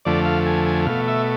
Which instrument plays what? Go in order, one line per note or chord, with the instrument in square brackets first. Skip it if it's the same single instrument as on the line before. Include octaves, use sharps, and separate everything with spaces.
[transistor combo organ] F2 D3 F3 A3 D5
F5
G#5
G#5
B2 A3 F5
E5